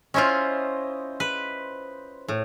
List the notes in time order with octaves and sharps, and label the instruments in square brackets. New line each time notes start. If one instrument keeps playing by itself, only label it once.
[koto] C#4 E4 F4 [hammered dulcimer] C5 C#5 D#5
[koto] B4
A2